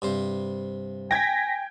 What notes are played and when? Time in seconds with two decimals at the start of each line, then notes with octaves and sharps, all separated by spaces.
0.02 G2 C3 C5
1.11 G5 G#5 G#6 A#6 B6